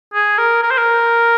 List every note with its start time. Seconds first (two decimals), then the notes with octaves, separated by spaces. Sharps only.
0.14 G#4
0.38 A#4
0.63 A#4
0.71 C5
0.78 A#4